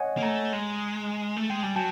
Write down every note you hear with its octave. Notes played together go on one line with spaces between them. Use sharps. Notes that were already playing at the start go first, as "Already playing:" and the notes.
Already playing: C#5 D#5 F#5 G#5
A#3
A3 G#5 A#5
G#3
A3
G#3 G5
G3 G#5
F#3 G5 A5